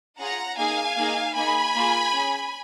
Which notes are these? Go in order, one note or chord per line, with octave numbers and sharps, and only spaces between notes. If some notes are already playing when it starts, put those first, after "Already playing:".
C#4 F4 G#4 F#5 A#5
A#3 D#4 G#4 F5 G#5
A#3 D#4 G#4
A#3 D#4 G#4 G#5 B5
A#3 F4 G#4
C#4 G#4